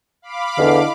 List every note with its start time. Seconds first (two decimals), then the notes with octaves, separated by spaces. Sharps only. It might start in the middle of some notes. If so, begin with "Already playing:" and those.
0.22 F5 B5 D6
0.59 E2 D3 E4 A4 D#5